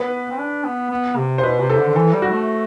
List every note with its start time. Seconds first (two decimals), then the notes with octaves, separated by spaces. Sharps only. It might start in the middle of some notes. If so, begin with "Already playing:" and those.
Already playing: B3 B4
0.30 C4
0.38 D4
0.64 B3
0.91 B3
1.17 C3
1.38 C5
1.43 B2 B4
1.60 C3
1.70 A4
1.78 D3
1.89 D3
1.96 E3 A4
2.13 G3
2.22 F#4
2.31 A3